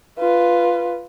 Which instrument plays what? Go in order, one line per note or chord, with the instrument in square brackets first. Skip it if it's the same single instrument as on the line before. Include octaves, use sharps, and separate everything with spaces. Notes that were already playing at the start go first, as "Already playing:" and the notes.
[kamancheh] F4 B4